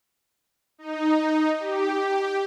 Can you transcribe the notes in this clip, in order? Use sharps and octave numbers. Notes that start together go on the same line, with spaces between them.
D#4
G4